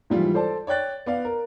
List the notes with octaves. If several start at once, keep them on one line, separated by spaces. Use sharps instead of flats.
G#2 E3 F3 G3 E4 F4
A4 C5 D5 A5
C#5 D5 G5 F#6 A6
B3 D5 F5
A#4